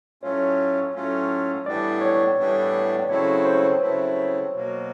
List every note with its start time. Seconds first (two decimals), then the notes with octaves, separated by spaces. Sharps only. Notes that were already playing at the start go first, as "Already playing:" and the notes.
0.23 A2 F#3 A3 C#4 F4 C#5
0.94 A2 F#3 A3 C#4 F4
1.66 A2 E3 G3 B3 D4 D5
2.01 C#5
2.38 A2 E3 G3 B3 D4
3.01 D5
3.09 C#3 F#3 A3 C4 E4 C#5
3.46 C5
3.81 C#3 F#3 A3 C4 E4 B4
4.53 B2 F#3 A#3